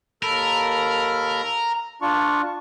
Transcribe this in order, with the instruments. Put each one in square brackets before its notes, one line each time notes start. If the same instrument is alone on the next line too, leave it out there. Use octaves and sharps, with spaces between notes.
[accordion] D#2 A4 B5 [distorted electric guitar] A#4
[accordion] D4 F4 C#6